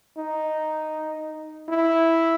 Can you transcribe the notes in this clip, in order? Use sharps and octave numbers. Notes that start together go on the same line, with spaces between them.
D#4
E4